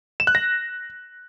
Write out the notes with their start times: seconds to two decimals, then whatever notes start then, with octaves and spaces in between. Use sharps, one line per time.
0.20 E7
0.27 F#6
0.35 A#6